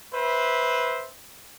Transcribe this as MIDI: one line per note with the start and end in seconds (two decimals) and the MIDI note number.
0.14 1.08 71
0.14 1.08 72
0.14 1.08 76